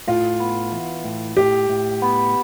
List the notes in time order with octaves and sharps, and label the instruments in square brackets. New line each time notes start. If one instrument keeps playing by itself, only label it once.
[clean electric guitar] A2 [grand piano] F4
[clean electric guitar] B3
E3
A2
[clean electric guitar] A2 [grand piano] G4
[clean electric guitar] A2
B3